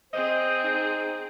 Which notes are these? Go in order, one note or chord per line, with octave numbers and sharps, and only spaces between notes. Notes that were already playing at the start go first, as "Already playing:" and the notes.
C4 G#4 C5 D#5
D#4